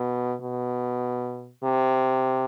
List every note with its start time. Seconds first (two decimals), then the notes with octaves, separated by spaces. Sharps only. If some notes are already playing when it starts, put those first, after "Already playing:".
Already playing: B2
0.41 B2
1.64 C3